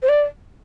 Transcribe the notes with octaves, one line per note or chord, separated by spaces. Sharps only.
C5
D5